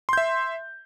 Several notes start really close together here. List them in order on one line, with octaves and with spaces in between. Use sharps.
C6 G6 E5